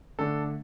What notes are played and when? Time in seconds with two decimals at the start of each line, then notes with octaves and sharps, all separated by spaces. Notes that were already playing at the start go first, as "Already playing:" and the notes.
0.19 D3 A3 D4 A4